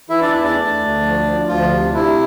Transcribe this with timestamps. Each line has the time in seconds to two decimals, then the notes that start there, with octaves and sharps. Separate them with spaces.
0.10 E3 E4 E5
0.21 D4 D5
0.33 E2 E4 E5
0.44 D4 D5
0.55 A3
0.79 D2
1.02 F3
1.24 F3
1.47 D2 F3 F4
1.70 C3
1.83 D4
1.93 C3 E4